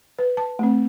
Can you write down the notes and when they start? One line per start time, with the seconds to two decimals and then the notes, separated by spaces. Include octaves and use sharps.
0.19 B4
0.37 A5
0.59 A3 C4